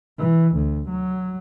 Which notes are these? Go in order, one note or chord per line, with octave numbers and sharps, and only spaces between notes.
E3
D2
F#3